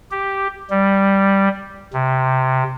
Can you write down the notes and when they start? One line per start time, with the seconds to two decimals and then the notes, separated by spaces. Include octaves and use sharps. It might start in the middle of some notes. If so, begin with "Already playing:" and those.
0.11 G4
0.70 G3
1.93 C3